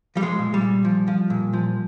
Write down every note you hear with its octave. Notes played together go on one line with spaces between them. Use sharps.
F3 G3
G#3
A#2
G3
A#2
F3
F3
A#2
F3